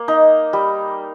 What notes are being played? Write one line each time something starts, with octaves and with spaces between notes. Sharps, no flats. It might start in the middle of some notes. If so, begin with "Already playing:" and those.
Already playing: A#3
D#4
G3